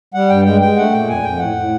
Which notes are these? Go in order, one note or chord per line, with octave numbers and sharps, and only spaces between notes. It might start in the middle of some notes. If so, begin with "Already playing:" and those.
G3 F#5
G2 G5
G#3 G5
G#3 G5
A3 F#5
A#2 G5
F2 G#5
F2 G5
A2 F#5
A2